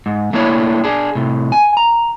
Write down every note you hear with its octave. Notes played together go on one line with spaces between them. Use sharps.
G#2
A3 A#3 D4 E4 C#5
D4 G#4
A2 C3
G#5
A#5